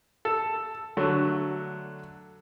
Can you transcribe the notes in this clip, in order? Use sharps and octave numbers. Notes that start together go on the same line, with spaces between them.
A4
D3 F#3 A3